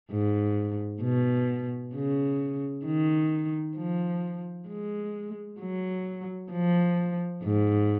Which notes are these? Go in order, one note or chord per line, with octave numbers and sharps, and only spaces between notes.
G#2
B2
C#3
D#3
F3
G#3
F#3
F3
G#2